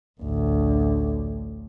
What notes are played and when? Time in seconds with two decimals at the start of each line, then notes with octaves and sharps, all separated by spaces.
0.21 A1 D2